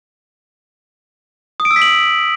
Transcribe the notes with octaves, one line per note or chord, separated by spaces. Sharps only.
D#6
D7
E6
B6
F#7